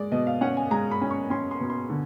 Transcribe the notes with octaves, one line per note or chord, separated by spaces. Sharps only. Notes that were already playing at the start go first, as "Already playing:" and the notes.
Already playing: G#3 D5
B2 D#5
F5
C#4 F#5
G#5
G#3 A#5
B5
C#4
C#6
C#4 C6
C6
B2
C6
D3